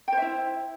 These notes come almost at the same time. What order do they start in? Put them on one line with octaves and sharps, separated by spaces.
G5 C5 E5 E4